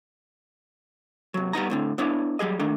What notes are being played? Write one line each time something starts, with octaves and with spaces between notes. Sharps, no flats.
C3 F#3
G3 B3 D#4 A#5
A2 D3 C4
B3 D4 E4 C#5
F#3 G3 G#4 D#5
D#3 A3 D4 D#4